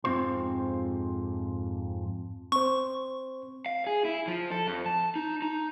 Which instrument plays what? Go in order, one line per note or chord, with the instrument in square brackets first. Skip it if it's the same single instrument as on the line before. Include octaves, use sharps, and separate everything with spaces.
[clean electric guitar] F2 G#2 C4 F4 C5 C6
[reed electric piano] C4 C5 [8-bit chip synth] C#6
[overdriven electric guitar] F5
G#4
E4
F3
A4
F2
A5
D#4
D#4